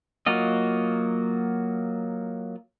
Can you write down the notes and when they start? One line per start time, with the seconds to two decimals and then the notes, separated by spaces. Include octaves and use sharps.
0.26 F#3 A#3 F4 F#4 D#5